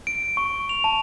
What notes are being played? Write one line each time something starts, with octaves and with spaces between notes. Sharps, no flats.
D7
C#6
F7
A5